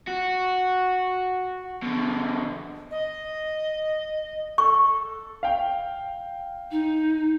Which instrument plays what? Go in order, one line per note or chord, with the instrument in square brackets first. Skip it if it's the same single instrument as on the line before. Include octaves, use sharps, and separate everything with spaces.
[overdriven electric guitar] F#4
B2 D3
[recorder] D#5
[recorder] A4 [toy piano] C#6
[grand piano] F5 G5
[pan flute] D#4